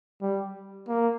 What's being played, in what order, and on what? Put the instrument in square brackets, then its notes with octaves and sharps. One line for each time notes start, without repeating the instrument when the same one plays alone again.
[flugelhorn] G3
A#3